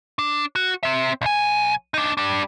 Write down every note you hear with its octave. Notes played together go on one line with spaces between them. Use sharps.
D4
F#4
C4 E5
B1 G#5
D4 D#4
G3 D4